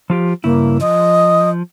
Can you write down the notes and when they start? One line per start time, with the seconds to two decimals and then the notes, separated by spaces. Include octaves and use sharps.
0.10 F3 F4 G4
0.44 G2 C#3 A#3 E4
0.81 F3 D#5